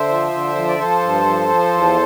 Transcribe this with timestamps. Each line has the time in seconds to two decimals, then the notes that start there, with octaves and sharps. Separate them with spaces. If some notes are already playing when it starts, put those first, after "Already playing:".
Already playing: D3 C5 E5
0.08 F3
0.32 D3
0.55 F3
0.68 D5
0.78 F3 A4 C5
1.02 G2
1.25 F3
1.48 F3
1.72 E2